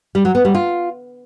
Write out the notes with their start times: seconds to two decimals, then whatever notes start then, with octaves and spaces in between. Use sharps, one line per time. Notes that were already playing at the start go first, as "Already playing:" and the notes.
0.15 G3
0.25 F#3
0.35 B3
0.45 G3
0.55 F4